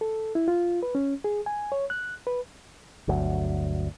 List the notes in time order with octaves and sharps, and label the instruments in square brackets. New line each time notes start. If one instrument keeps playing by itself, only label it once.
[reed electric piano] A4
E4
F4
B4
C#4
G#4
G#5
C#5
F#6
B4
[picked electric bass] G1 D2 F#3